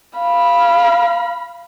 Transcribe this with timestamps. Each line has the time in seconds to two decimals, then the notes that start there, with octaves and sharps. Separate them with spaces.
0.19 F5 B5